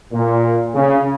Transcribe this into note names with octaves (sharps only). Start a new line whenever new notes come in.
A#2
C#3